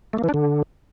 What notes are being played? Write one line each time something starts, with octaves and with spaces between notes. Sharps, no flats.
A3
A#3
E3
D4
D3